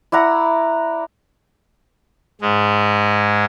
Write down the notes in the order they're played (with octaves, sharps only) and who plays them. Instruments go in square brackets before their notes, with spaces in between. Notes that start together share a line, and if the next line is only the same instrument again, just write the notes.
[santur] E4 D5 F#5 A#5
[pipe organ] G#2 G#3